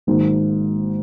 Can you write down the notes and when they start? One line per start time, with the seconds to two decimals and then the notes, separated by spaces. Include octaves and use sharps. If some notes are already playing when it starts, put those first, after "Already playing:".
0.07 G#1 G#2 F#3 A#3 D#4